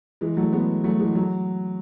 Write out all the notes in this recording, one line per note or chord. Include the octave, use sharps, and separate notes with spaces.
E3 G#3
F#3 A3
G#3 B3
F#3 A3
E3 G#3
F#3